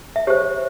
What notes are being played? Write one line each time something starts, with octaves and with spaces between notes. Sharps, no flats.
E5
G4 C5 C#5